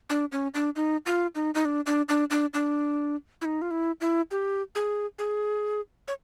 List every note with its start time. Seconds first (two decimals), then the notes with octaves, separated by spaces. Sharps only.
0.10 D4
0.32 C#4
0.54 D4
0.76 D#4
1.06 F4
1.35 D#4
1.55 D#4
1.65 D4
1.86 D4
2.09 D4
2.30 D4
2.54 D4
3.41 E4
3.45 D#4
3.62 F4
3.71 E4
4.01 E4
4.31 G4
4.75 G#4
5.19 G#4
6.08 C#5